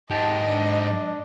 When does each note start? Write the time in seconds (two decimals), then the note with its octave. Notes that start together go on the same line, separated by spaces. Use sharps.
0.10 G#2 G4 D#5 A5
0.47 D4